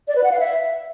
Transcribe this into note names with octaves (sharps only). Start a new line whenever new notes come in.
D5
B4
F#5
F5
E5